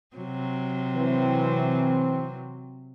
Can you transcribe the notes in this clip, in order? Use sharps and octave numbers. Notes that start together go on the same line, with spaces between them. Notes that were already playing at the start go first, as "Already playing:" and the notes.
C3 F#3
E3 C4